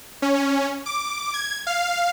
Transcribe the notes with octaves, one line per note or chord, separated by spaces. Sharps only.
C#4
D6
G#6
F5